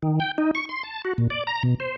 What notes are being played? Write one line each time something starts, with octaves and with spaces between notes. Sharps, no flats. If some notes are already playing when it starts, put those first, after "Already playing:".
D#3
G5
D#4
C#6
C6
A5
F#4
A#2
D5
A#5
B2
C5